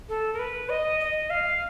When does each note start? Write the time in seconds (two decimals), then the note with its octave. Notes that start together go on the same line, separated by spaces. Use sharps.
0.09 A4
0.33 A#4
0.39 B4
0.70 D#5
1.00 D#5
1.30 F5